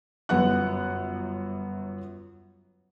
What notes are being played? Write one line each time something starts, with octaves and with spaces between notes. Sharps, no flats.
G1 F#2 B3 F#5 F#6